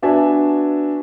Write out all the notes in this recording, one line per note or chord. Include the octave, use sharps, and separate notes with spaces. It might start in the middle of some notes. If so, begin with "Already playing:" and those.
B3 D4 F#4 E5 G#5 A5